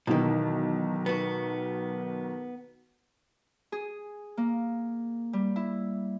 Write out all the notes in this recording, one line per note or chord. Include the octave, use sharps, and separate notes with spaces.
B1 B2 D#3 E3
B3 F#4
G#4
A#3
G3
E4